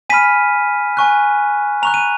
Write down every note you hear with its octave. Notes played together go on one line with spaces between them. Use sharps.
G#5 B5 F6 B6 D#7
G#5 C#6 F#6
A#5 C#6 F#6 F7
D#7